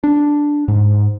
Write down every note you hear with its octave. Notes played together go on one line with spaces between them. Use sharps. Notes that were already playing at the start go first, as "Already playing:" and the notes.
D4
G#2